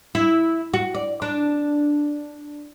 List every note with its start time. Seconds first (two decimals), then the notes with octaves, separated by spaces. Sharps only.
0.15 E4
0.74 F#4
0.94 D5
1.22 D4